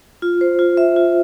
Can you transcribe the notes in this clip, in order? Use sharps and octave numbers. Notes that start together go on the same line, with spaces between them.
F4
C5
F4
E5
F4